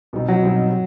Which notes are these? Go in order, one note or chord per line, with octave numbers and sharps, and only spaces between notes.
B2 G3 C4 D#4
F#3
B2 G3 C4 D#4